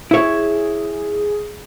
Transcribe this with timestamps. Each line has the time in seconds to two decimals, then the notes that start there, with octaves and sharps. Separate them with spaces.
0.11 E4 G#4 C#5